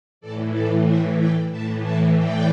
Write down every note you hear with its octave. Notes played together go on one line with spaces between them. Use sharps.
A2 E3 A4 D5
A4 D5
C5 E5
D5 G5
A2 E3 E5 A5
E5 A5
D5 G5